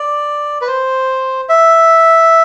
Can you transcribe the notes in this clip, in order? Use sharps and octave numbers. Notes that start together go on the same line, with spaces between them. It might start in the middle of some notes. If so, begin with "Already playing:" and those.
Already playing: D5
B4
C5
E5